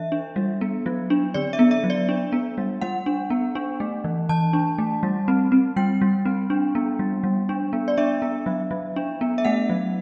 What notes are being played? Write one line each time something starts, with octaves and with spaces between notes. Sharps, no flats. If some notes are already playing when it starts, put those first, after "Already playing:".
Already playing: E3 E5
D4
G3
B3
F#3
D4
D3 D5
E5
B3
E5
F#3
D5
D4
B3
G3
G3 F#5
D4
B3
D4
A3
E3
E3 A5
D4
A3
G3
C4
C4
G3 G5
G3
C4
D4
B3
G3
G3
D4
B3
D5
D4 E5
B3
F#3
F#3
D4
B3
E5
A3 F#5
F#3